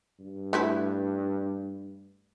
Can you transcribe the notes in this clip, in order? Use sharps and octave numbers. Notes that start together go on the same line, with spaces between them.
G2
A3 E4 B4